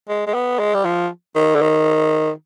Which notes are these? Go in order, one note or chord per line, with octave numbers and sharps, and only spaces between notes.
G#3
G#3
B3
G#3
G3
F3
D#3
D3
D#3